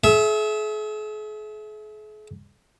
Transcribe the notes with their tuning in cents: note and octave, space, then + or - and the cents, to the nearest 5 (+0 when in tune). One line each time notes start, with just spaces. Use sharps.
G#4 +45 E5 +0